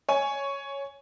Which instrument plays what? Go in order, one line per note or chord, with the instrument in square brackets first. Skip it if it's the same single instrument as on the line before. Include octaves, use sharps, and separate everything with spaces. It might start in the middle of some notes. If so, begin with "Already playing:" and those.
[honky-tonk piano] C#5 G#5